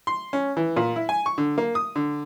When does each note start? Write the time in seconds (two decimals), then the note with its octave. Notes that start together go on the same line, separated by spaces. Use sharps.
0.07 C6
0.33 C#4
0.57 E3
0.76 A#2
0.96 E4
1.09 G#5
1.26 C#6
1.38 D3
1.58 A#3
1.75 D#6
1.96 D3